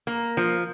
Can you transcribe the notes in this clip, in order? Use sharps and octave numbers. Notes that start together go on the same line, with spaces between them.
A#3
F3